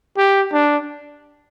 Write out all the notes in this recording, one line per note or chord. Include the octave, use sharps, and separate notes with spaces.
G4
D4